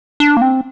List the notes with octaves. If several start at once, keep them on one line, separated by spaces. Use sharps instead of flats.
D4
A#3
C4